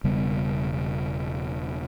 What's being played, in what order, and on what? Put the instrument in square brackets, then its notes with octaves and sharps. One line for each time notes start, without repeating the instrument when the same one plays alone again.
[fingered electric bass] E1 C#3 G3 B3